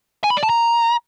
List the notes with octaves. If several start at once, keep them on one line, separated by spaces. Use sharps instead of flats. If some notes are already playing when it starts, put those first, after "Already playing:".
G#5
B5
D5
A5
A#5